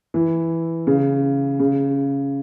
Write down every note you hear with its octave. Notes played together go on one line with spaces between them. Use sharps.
E3
C#3
C#3